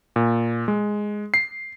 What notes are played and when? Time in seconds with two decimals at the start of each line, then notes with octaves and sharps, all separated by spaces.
0.16 A#2
0.68 G#3
1.34 C7